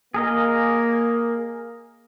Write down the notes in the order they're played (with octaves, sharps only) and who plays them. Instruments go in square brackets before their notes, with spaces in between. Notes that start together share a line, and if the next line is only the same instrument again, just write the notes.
[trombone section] A#3 [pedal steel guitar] G#4 A#4 D#5